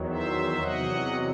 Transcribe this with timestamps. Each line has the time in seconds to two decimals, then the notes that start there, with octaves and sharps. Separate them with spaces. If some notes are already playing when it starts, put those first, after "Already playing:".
Already playing: E2 D#3 F#3
0.08 C5 E5
0.61 E2 C3 F#3 D#5 F#5